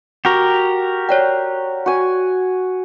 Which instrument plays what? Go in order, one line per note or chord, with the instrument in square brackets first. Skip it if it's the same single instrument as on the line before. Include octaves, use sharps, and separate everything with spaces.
[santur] F#4 [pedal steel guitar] G4 A#4
[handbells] C#5 D5 G5
[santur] F#4 G#5